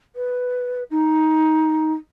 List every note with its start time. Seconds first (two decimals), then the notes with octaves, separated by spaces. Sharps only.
0.16 B4
0.91 D#4